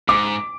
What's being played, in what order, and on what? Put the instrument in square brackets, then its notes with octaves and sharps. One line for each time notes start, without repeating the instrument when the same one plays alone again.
[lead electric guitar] G#2 [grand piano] D6